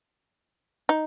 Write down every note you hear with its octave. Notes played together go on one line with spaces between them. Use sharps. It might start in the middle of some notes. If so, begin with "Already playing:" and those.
D#4